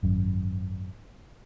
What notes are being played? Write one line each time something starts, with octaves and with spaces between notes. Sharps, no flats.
G#1 F#2